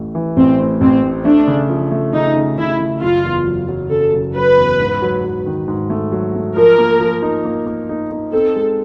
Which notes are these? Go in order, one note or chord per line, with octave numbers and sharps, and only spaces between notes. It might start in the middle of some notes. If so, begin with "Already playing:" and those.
Already playing: A1 A2 A3
E3
A1 C4
A2
A1 C4
A2
A3 D4
C#3
F3
A3
C#3 D#4
C#3
C#3 E4
C#3
F#1 F4
E2
F#3
F#3
C#3 A4
F#1
F#3 B4
E2
G#2
F#3
F#3
D#3
G#2
A3
F#3
A3
F3 A#4
A#3
F3
D#4
A#3
A#3
D#4
D#4
C4 A4
G#3